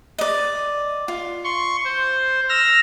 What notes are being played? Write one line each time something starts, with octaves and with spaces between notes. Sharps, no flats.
D5 D#5
F4
C6 C#6
C5
E6 F6 A#6